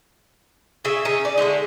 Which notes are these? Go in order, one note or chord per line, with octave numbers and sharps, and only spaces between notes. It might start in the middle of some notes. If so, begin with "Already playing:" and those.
C#3 G#4 E5
C#4 D#4
D5
D3 G#3 A3 D#4